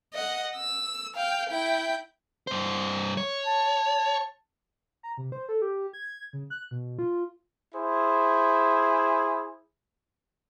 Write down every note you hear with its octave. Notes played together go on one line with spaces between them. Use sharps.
D#5 F#5
E6
F5 G5
E4 G5
G2 C5
C#5
A5
A#5
C3
C5
A4
G4
G#6
C#3
F#6
B2
F4
E4 G#4 C5